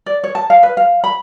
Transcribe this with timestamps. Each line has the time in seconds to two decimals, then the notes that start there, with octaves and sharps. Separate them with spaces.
0.06 D5
0.24 C#5
0.35 A5
0.50 F5
0.63 B4
0.77 F5
1.04 B5